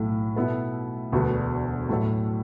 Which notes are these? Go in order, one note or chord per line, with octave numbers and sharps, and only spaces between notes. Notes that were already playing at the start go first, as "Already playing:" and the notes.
Already playing: B1 A2 A3
B2 B3 E4 A4
E1 D2 D3 B3 F#4
A2 F#3 A3 F#4 A4